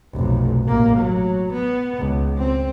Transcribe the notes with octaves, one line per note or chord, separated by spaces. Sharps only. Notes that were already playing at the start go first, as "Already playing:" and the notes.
F1 B1
A1 A#3
F#3
B3
C#2
C4